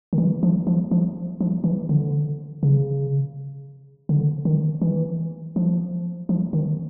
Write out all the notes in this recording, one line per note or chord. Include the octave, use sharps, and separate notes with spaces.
D#3
E3
F3
F3
F3
F3
E3
D3
C#3
D3
D#3
E3
F3
F3
D#3